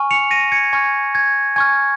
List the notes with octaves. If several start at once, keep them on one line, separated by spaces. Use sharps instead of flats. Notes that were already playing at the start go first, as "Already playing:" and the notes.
Already playing: G#5 C#6 F6
C#7 F7
A#6 D#7
G#6 C#7
G#5 C#6 F6 G#6
G#6
G#5 C#6 F6 G#6